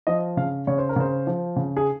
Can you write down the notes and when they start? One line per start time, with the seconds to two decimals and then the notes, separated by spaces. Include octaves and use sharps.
0.07 F3 D#5
0.37 C#3 F5
0.67 C#3 C#5
0.78 C5
0.89 A#4
0.96 C#3 C5
1.27 F3
1.56 C#3
1.77 G#4